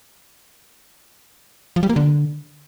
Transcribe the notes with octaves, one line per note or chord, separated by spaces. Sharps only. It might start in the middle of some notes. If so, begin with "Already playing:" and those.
F3
G3
A#3
D3